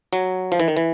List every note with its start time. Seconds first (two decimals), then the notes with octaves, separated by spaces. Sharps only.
0.13 F#3
0.52 F3
0.60 E3
0.68 D#3
0.77 E3